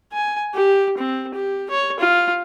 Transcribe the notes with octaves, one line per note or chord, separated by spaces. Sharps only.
G#5
G4
C4
G4
C#5
F4